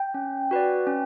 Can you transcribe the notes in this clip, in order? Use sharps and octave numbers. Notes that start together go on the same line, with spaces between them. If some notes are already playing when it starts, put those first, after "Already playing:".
Already playing: G5
C#4
F#4 B4 D5
C#4